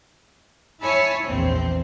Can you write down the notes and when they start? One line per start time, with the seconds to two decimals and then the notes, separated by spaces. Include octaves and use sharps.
0.81 E4 C#5 G#5 A5 B5
1.26 A#1 E2 C4